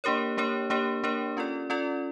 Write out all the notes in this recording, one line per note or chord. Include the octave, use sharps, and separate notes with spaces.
A#3 D4 G4 A#4 C#5
A#3 D4 G4 A#4 C#5
A#3 D4 G4 A#4 C#5
A#3 D4 G4 A#4 C#5
C#4 F4 A4 D5
C#4 F4 A4 D5